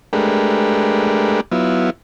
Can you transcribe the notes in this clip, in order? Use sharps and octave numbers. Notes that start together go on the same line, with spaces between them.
G#3 A3 D4 G4 A#4 B4
F#3 B3 E4 F4